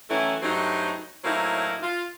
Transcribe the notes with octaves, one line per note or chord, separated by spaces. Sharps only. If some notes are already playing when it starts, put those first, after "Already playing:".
D#3 E3 F#3 A3 C#4 E4
G2 F#3 A3 C4 D#4
A2 F#3 A#3 C4 D#4 E4
F4